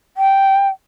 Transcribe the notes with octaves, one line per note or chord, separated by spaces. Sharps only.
G5